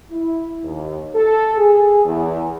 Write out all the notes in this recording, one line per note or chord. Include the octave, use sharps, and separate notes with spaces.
E4
D#2
A4
G#4
E2